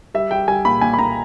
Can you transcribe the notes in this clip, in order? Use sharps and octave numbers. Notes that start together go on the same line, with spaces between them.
G3 E5
G3 G5
G3 G#5
A#2 B5
A#2 G#5
B5
A#2 A#5